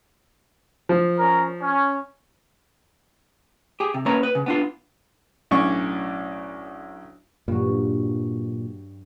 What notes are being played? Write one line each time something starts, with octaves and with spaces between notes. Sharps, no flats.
F3
C#4 A#4
C#4
G4 G#4
C3
A#3 C#4 A#4 B4 C#5 A#5
B4
C#3
B3 D4 F4
B1 A2 C#4 D4 D5 C#6
G2 A#2 F#3